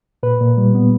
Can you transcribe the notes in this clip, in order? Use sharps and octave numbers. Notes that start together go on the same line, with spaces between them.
A#2 B4
A#2
G3
B3